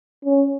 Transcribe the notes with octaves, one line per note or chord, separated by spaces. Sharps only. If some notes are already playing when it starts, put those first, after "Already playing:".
C#4